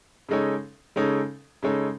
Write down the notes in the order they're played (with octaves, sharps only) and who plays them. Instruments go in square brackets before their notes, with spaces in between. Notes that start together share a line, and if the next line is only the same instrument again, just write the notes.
[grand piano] C#3 G#3 D#4 A4 C#5
C#3 G#3 D#4 A4 C#5
C#3 G#3 D#4 A4 C#5